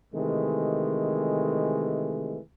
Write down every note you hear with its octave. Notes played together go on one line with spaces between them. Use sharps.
C3 D#3 E3 G#3 A3